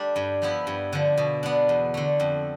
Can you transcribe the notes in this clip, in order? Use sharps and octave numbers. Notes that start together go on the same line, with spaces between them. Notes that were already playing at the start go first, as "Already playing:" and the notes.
Already playing: G3 A3 D4
G2
F3 B3 E4
G2
D3 F3
B2
B3 D4
E2
D3 A3
F2